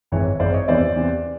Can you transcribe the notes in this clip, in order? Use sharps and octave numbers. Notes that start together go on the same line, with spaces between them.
G#1 G#2 E3 C#5
G#1 G#2 E3 C5 D5
C#5 D#5
E2 C3 E3 C5 D5
E2 C3 E3